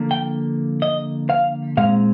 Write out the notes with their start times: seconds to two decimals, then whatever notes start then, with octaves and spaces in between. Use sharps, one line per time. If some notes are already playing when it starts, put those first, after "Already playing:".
Already playing: D3 F3 A#3
0.11 G5
0.82 D#5
1.30 F5
1.77 A#2 G#3 C4 F5